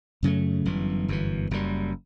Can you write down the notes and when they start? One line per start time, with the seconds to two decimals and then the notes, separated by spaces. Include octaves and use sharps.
0.23 F#2 C#3 F#3 A3
0.65 G1 F#2 E3
1.08 G1 F#2 E3
1.51 F#1 F#2 C#3 G3